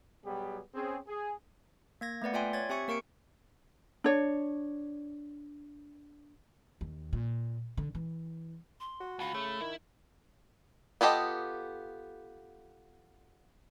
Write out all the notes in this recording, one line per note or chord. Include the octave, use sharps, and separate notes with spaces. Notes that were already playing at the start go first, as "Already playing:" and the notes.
B2 F#3 G3 B3 G4 G#4
C4 C#4 G#4
G#4
A#3 G#6 A#6
A3 B3 B4 D5 F#5
F4 D5 E5 G5 G#5 C6
C#5 G#6 A6
C4 G4 E5 G#5 C#6 C#7
A#3 A#4 C#6 C#7 D7
D4 C#5
D#2
A#2
D3
E3
C6
F#4
C#2 F4 B5
C#3 A3
D#3 E4
B3 F4 G4 A4 D#5